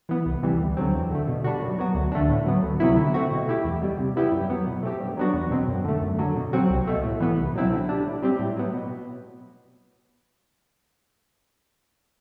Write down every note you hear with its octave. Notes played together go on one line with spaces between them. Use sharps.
E3 B3
C2
C3 E3 G3
D2
D3 F#3 C4
E2
D3 A3
B2
G3 D4 F#4
F#2
F#3 B3 F#4
D2
D3 A3 D4
A2
F#3 B3
D2
C3 F#3 B3 E4
D3
A3 C4 F#4
B2
A3 E4 G4
E2
B2 G3
C3
G3 B3 E4 G4
F#2
F#3 B3
B2
A3 C4 G4
G2
F#3 B3 D4 F#4
E2
B2 F#3 C4
F#2
D3 A3
F#2
D3 F#3
B2
F#3 C4 F#4
C2
B2 A3
A2
E3 B3
C2
B2 F#3 C4 E4
D3
G3 D4
A2
G3 C4 G4
A2
F#3 B3
B2